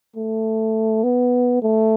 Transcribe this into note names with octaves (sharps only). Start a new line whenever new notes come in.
A3
B3
A3